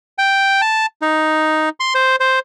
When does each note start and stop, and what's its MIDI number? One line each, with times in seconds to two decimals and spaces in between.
0.18 0.61 79
0.62 0.86 81
1.02 1.69 63
1.80 1.94 84
1.95 2.16 72
2.20 2.39 72